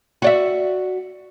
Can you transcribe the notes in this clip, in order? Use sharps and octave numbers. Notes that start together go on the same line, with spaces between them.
F#4 D5 E5